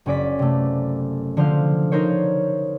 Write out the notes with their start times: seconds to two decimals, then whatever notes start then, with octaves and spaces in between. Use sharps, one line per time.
0.06 F#1 C#4 D5 B6
0.39 C3 A3
1.37 D3 F3 C5 F5
1.92 D#4 A#4 C5 C#5